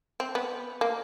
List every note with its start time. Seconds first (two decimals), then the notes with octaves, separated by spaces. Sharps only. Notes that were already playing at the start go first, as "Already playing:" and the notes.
0.20 C4
0.35 B3
0.81 A#3